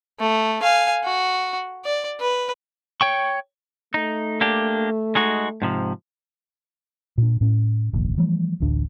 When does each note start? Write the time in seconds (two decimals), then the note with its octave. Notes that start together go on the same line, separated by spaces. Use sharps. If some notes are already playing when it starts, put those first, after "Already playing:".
0.20 A3
0.63 F5 G#5
1.04 F#4
1.85 D5
2.20 B4
3.01 C#5 G5 C#6
3.94 A3 D#4
4.41 A#3 D4 G4
5.15 G#3 D#4 F#4
5.62 G#2 C3 F3
7.18 A#2 D4
7.41 A2 C#4
7.93 F1 A#1 D#2
8.18 E3 F3 G3 A3
8.60 D1 A1 D2 D4